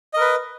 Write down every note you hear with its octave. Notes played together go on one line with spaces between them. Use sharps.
A#4 B4 D#5